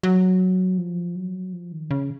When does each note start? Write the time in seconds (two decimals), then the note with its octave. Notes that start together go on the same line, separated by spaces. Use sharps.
0.03 F#3
0.78 F3
1.16 F#3
1.53 F3
1.72 D#3
1.91 C#3